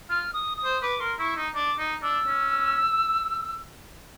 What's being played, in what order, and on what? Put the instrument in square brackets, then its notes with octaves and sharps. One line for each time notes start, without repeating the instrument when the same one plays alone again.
[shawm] F4 [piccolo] F6
[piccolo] D#6
D#6
[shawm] C5
[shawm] B4 [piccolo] D6
[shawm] A#4 [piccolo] C6
[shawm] E4 [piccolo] C#6
[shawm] D#4
[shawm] D4 [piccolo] D6
[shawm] D#4
[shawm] D4 [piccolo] E6
[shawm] C#4